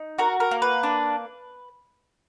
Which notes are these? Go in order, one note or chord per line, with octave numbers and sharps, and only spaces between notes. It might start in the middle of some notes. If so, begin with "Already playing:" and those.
Already playing: D#4
F#4 A#4
A#4
A#3
B4
D4